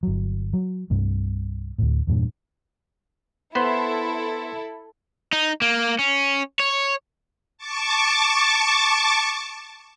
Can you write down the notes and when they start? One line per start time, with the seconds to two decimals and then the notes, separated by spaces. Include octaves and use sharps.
0.03 G1 F#3
0.53 F#3
0.90 C2 G2 C3 A3
1.78 D2 A2
2.07 E2 G2 A#2
3.55 B3 E4 A4 C5 B5 C6
5.33 D#4
5.62 A#3
5.99 C#4
6.60 C#5
7.58 A5 C#6 D6